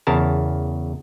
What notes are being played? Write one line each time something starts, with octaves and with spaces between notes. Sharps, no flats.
E2 C#3 A#4 A5